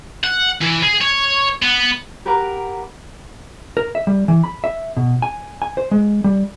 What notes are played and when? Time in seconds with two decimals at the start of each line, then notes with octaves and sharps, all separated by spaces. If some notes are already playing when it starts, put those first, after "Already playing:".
0.24 F#5
0.62 E3
0.83 G#4
1.01 C#5
1.62 B3
2.25 G4 A#4 B4 F#5 A#5 D6
3.77 A#4
3.95 E5
4.07 G3
4.28 E3
4.44 B5
4.64 E5
4.97 B2
5.22 G#5
5.62 G#5
5.77 C5
5.91 G#3
6.24 G3